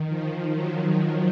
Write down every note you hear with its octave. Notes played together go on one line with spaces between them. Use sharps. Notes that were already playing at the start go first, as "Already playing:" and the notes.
Already playing: D#3
F3
F#3